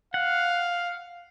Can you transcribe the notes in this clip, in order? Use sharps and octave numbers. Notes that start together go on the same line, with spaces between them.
F5 F#5